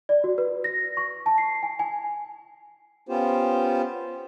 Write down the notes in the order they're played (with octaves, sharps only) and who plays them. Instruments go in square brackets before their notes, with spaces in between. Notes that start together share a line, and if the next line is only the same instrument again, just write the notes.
[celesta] D5
F#4
B4
A#6
C#6
A5
C7
G#5
G#5
[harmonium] B3 C#4 F4 G4 C5